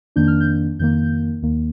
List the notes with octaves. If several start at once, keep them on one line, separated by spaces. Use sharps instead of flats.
F2 D#3 A#3 D4 G6
F6
G6
F2 D#3 A#3 G6
D#2 D#3 A#3